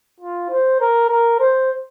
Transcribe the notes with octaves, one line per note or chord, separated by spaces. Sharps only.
F4
C5
A#4
A#4
C5